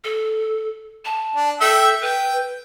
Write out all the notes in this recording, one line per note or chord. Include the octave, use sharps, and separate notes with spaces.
A4
A5
D4
A4 E5 G5 E6
B4 G5